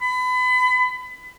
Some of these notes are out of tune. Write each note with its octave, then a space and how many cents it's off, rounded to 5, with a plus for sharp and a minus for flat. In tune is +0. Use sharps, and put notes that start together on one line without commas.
B5 +30